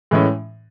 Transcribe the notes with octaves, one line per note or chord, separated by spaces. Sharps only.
A2 E3 G#3 C#4